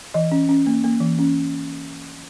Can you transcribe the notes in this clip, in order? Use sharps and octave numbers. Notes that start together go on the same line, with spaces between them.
E3 D#5
C#4
C#4
A#3
A#3
E3
C#4